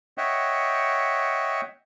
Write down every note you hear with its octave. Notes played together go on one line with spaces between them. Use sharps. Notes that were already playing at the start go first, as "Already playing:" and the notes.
C#5 D#5 E5 F#5 G5